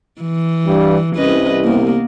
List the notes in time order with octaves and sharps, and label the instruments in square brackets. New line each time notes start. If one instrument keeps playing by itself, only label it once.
[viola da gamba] E3
[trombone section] G2 G3
[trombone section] C2 [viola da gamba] C#4 B4 D#5
[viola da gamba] A#3 B3